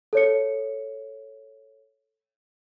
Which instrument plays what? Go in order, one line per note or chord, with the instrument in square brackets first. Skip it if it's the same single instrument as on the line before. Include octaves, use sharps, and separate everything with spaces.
[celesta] A4 C#5 C#7